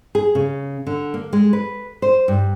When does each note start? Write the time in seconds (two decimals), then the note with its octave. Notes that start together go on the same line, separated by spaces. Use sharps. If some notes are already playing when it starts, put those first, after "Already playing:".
0.15 G#4
0.35 C#3
0.87 D3
1.14 A#3
1.33 G#3
1.53 B4
2.02 C5
2.28 G2